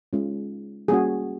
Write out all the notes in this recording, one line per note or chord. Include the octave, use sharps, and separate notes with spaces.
G#3 C#4 F4
G3 A#3 C#4 F#4 G#4